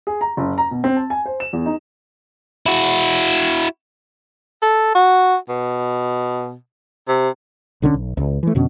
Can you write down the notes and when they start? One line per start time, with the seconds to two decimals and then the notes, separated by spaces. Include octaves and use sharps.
0.07 G#4
0.21 A#5
0.37 F#1
0.58 A#5
0.71 B2
0.84 C4
0.96 A5
1.10 G#5
1.26 C5
1.40 E7
1.53 E2
1.66 D#4
2.66 E4 F#4
4.62 A4
4.95 F#4
5.49 B2
7.08 C3
7.82 B1 D3 F3 C#4
7.94 B1
8.17 C#2
8.43 E3 A3
8.55 F2 B2 D3 C#4